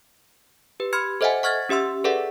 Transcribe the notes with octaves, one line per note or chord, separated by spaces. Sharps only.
G4 B4
B5 C6 F6 G#6 C#7
A4 C5 D#5 E5 F#5 G#5
F#5 C#6 F6 G#6 A6
C#4 G4 E5 C6 E6
G#4 A4 B4 D5 E5 F#5